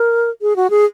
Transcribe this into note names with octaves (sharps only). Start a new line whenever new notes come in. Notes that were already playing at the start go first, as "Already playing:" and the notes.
Already playing: A#4
G#4
F#4
G#4